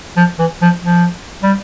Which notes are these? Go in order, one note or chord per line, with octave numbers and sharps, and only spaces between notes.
F3
E3
F3
F3
G3